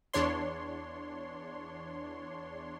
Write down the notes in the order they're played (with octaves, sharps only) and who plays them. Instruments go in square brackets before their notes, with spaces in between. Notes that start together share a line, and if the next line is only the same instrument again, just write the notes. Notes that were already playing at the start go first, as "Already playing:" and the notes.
[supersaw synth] E2 D4 C#5 C6